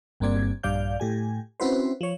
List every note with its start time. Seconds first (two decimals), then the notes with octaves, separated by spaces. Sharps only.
0.20 G1 G2 A#3 C4 D5 G#6
0.63 A#1 G2 D5 F5 G6
1.00 A2 G4 G#5
1.60 C4 C#4 E4 F#4 B4 C5
2.01 F3 C#5